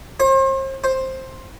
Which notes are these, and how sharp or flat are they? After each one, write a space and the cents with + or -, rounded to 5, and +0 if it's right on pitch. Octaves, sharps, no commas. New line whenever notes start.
C5 +40
C5 +10